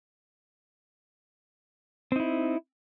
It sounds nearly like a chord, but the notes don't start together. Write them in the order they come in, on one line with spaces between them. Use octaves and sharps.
C4 D#4 E4